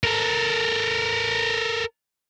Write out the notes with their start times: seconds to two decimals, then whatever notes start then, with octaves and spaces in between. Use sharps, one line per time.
0.04 A4 A#4